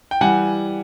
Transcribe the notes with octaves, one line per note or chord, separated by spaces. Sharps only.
G5
E3 G3 F#5 G#5